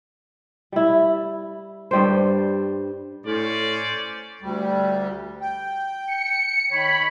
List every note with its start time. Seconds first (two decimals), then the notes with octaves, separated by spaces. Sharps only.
0.72 G3 E4
1.91 G2 G3 C5
3.26 A2 C#4 C5 D5
4.42 D2 G3
5.41 G5
6.07 C#7
6.71 D#3 C#5 B5